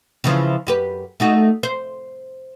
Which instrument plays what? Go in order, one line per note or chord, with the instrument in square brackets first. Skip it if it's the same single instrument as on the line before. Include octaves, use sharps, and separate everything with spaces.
[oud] C#3 E3 F3
F#2 G4 B4
A3 D#4 F#4
C5